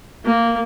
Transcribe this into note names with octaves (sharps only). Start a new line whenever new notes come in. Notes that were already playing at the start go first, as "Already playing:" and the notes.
A#3